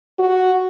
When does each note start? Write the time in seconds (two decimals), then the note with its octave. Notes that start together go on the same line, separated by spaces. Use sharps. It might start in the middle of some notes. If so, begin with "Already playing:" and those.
0.19 F#4